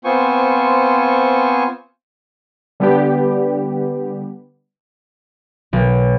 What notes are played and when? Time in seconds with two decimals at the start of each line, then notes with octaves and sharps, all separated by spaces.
0.05 B3 C4 F4 C5 G#5 C#6
2.80 D3 G3 B3 D4 G4
5.73 B1